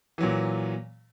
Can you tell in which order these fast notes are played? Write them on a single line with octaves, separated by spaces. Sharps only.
E3 F#3 A#2